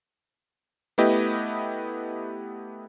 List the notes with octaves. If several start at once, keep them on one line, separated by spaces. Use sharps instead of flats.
A3 B3 E4 G4 B4 D#5